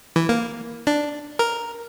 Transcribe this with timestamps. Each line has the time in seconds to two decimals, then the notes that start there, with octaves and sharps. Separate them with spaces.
0.16 E3
0.29 A#3
0.87 D4
1.39 A#4